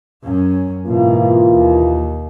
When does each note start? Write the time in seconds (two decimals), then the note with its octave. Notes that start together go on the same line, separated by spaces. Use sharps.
0.23 F#2 C#4
0.87 G#2 B2 E3 A#3 F4
1.53 D#2